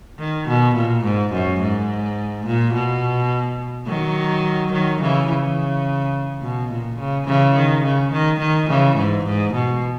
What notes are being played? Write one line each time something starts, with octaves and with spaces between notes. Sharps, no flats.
D#3
B2
A#2
G#2
F#2
G#2
A#2
B2
D#3 F#3
D#3 F#3
C#3 E3
C#3
B2
A#2
C#3
C#3 E3
D#3
C#3
D#3
D#3
C#3 E3
G#2
G#2
B2